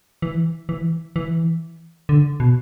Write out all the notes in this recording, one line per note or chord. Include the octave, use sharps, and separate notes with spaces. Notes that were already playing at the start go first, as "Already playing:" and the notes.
E3
E3
E3
D3
B2